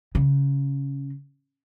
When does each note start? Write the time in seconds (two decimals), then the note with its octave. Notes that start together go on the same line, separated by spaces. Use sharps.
0.15 C#3